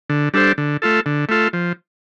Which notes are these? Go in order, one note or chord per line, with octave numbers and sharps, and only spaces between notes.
D3
G3 D4 A4 C5
D3
A3 F4 A4
D3
A3 F4 A4
F3